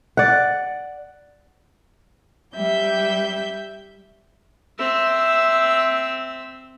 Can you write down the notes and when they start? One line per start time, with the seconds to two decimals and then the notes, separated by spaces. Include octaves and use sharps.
0.17 D5 F#5
2.56 G3 E5 G6
4.78 C4 E5